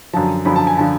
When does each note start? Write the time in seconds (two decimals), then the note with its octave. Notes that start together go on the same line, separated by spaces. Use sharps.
0.13 F#2 D3 F3 A5
0.45 F#2 D3 F3 B5
0.56 A5
0.67 G#5
0.77 D3 F3 A5